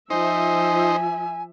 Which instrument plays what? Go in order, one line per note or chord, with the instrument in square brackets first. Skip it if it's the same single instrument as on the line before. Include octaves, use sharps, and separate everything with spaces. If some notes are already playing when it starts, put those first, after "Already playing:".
[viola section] F3 E5 [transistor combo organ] D#4 C5 [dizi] G#5